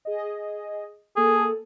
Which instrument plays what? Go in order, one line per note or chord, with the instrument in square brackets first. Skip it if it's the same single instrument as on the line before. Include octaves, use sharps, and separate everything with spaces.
[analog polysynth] G#4 D#5
[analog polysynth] A#3 A4 [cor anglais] G#4